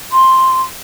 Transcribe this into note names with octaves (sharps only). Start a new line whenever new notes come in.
C6